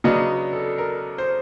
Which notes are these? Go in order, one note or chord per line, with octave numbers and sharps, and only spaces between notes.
C#3 F#3 B3 D4 D#5
A4
A#4
C5